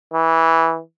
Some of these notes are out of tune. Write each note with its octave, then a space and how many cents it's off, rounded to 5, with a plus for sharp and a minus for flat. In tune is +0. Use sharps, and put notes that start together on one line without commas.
E3 -10